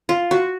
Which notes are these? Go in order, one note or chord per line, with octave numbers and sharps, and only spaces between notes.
F4
F#4